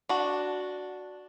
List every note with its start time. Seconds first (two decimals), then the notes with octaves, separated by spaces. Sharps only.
0.09 D4 F#4